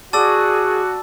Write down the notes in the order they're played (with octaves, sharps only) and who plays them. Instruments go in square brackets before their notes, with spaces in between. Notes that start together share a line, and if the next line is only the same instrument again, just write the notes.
[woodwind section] F#4 [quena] G#4 [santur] D5 [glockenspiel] A5 E6